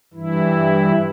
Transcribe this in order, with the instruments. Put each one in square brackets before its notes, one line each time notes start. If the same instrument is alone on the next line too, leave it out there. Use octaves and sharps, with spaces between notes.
[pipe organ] G2 E3 E4